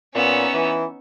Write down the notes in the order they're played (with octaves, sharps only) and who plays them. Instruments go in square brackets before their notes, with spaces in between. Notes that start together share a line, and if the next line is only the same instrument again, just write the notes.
[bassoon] A#2 [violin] B3 E6 [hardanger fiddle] C#4 D#4
[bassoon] E3